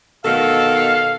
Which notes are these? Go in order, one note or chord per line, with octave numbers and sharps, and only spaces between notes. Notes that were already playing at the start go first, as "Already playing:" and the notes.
B2 D#3 A4 F5